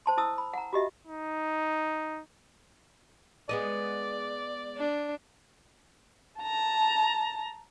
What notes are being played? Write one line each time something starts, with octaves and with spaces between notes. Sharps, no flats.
C5 A5 C6
E4 A5 D#6 E6
B5
F#5 A#5
F#4 G4 D#5 E5
D#4
G#3 B3 D5 D#5
D4
A5 A#5